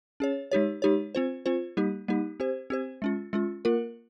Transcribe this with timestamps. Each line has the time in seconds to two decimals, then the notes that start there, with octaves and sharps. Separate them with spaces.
0.20 C#4 G#4 C#5
0.51 G#3 D#4 G4 C#5
0.82 G#3 D#4 G4 C#5
1.15 C4 F4 C5
1.46 C4 F4 C5
1.77 G3 A#3 D#4 G4
2.08 G3 A#3 D#4 G4
2.40 C4 G4 C5
2.70 C4 G4 C5
3.02 G#3 C#4 F4
3.33 G#3 C#4 F4
3.65 A#3 F4 A#4